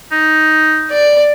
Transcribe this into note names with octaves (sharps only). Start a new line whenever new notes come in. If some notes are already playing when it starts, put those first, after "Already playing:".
D#4
D5